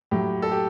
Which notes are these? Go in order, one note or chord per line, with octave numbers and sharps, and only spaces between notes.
A2 F#3 G4
A4
G4